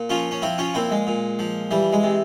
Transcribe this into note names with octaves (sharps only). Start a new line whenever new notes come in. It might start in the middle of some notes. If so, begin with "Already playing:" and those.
Already playing: A#2
F3 C#4 F4
C#4
F3 C4 E4
C#4 F4
A#2 C4 E4
G#3
A#2
F3
E3 G3
G#3
C3